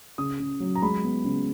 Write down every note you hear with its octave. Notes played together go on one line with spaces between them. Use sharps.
C#3 D#6
C#3
F#3
A#5
G#3 B5
B3
C#3